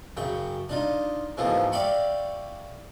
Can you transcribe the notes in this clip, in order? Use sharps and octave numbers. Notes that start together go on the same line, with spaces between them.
F#2 C#3 G5
D4 D#4 F4
G#2 B2 E3 F3 A3 A#3
D5 E5 F5 G5 B5 C#6